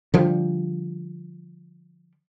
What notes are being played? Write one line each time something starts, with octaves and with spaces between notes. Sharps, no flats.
D3 F3 G3